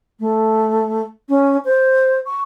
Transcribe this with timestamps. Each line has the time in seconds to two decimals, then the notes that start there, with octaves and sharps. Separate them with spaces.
0.20 A3
1.29 C#4
1.65 C5
2.26 C#6